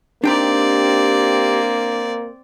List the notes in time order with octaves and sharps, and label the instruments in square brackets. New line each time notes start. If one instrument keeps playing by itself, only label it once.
[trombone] A#3 [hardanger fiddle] C4 D5 [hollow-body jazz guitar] D4 G5 A#5 [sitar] D#4 G4